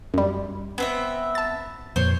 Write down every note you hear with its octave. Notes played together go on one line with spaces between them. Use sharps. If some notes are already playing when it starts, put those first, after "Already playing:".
F#2 G3
B3 C4 E5
A5 A6
F2 A#2 C5 C#5